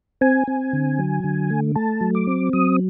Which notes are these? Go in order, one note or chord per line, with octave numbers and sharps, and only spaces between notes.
C4 G#5
C4
D3
F#3
D3
A3
A3 A5
F#3
D6
C4
F#3 D#6